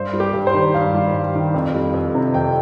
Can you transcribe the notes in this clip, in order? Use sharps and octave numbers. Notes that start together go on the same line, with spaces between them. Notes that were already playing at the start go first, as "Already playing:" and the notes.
Already playing: G2 C5
G3
G4
G2
C5
D#3
G2 F5
G3
G2
D#3
F2
G3
F2
C3
F2 G5